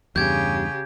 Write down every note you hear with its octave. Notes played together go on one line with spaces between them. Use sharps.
E2 G2 C#3 G4 G6 G#6